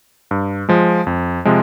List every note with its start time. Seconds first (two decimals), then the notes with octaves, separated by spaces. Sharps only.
0.31 G2
0.69 F3 G#3
1.07 F2
1.45 C3 F3 G#3